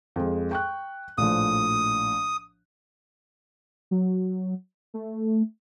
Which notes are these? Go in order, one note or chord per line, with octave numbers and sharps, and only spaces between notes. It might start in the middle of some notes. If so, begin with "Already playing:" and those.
F2 G#3
G5 C#6 F#6
A#1 A2 F3 D#6
F#3
A3